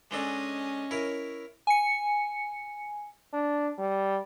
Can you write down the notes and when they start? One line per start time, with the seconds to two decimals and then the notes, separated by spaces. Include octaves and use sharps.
0.11 G#3 C#4 D4 A4 D#5
0.91 E4 A#4 C#5
1.67 G#5 C#7
3.33 D4
3.78 G3